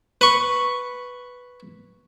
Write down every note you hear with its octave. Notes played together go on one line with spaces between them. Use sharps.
B4 C#6